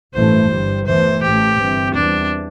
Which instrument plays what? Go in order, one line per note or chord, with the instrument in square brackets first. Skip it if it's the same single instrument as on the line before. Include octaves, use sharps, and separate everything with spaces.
[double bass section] A1 G2 E3 A3 [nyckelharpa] C5
[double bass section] G1 G2 G3
[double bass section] E2 E3 A3 [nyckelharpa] C5
[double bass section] A1 A2 A3 [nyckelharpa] G4
[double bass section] G1 G2 E3 C4
[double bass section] E2 E3 G3 C4 [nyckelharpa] D4